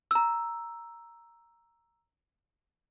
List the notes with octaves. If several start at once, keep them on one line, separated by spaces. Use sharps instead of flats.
A#5 E6